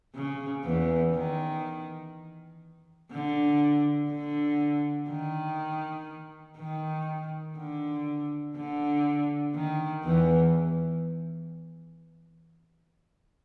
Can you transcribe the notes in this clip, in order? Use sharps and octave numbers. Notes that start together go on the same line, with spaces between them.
C#3
E2 E3
D#3
D3
D3
D#3
D#3
D3
D3
D#3
E2 E3